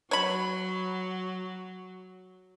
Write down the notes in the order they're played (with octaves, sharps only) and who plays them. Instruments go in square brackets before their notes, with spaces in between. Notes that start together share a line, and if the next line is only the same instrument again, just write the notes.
[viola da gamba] F#3 [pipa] C#5 B5